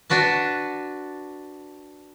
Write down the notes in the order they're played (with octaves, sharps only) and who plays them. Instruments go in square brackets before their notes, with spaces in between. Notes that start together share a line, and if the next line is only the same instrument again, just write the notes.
[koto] D4 F#4 B4 A5